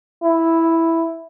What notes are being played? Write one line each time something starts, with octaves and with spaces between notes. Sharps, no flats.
E4